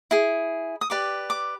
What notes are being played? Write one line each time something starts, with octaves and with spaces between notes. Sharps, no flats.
E4 G#4
D#6
G4 B4 D5 D6
D6